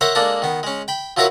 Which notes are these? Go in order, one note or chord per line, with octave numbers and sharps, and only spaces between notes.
A#4 C5 C#5 E5 F#5
G#3 A#3 D4 A4 A#4
D#3 B3
G#3 C#4
G5 B5
F3 F#3 E4 A#4 B4 C#5